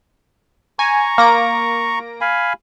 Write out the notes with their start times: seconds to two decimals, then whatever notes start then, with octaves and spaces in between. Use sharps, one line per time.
0.79 G#5 A#5 C#6
1.18 A#3 A#6 D7
2.21 F5 G#5 B5